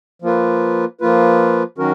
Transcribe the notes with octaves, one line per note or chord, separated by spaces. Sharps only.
F3 A#3 F4 B4
F3 A#3 F4 B4
D#3 F#3 C#4 F#4 A#4